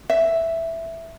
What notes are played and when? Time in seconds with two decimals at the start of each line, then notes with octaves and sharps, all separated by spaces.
0.10 E5